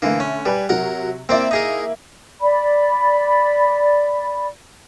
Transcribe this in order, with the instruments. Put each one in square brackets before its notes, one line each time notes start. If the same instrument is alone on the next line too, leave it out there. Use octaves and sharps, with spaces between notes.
[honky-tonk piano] D3 A3 [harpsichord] E3 A#3
[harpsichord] C#4
[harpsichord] G3 [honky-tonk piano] B4 D5 G#5
[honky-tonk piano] C3 F#3 [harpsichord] A#4 F#5
[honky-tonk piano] A#3 E4 [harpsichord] C4 C5 D5
[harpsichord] D#4 G#4 A#4
[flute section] D5 B5